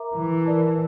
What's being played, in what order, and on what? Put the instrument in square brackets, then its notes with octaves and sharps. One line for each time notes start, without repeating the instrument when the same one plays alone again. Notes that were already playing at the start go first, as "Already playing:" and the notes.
Already playing: [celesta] A#4 E5 A#5 D6
[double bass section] E3
[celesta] A#4 D5 A5